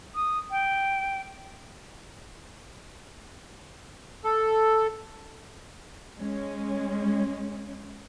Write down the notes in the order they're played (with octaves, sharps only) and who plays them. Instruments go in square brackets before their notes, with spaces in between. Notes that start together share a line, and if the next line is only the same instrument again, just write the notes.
[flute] D#6
G5
[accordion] A4
[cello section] G#3 C#4